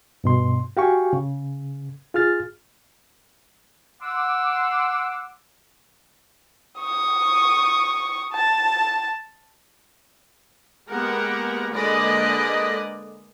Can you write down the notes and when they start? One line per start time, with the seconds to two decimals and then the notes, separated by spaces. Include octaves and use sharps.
0.24 G2 B2 C6
0.77 F#4 G4 F5 G5 G#5 C#6
1.13 C#3
2.14 F4 G#4 F6 A6
4.02 F#5 C6 D6 E6
6.80 C#6 D#6
8.33 A5
10.88 G#3 A#3 B3 G4 A#4 F#5
11.72 D3 G#3 A#3 B4 D5 D#5